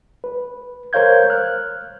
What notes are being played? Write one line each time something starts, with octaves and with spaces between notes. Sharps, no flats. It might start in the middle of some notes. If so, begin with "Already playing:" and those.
B4
A#4 C5 C#5 F5 G6 G#6
F6 F#6